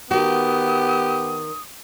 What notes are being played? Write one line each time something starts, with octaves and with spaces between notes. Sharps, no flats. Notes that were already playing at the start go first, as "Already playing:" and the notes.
D#3 B3 F#4 G4 D#6